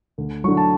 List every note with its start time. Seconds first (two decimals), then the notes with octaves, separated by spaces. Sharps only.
0.18 D2
0.44 F#3 C#6
0.48 D3
0.57 A5